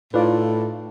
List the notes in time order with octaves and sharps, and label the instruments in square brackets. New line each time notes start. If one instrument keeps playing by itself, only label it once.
[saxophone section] A2 [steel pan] D#4 F4 D5 [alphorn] A4 [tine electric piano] B4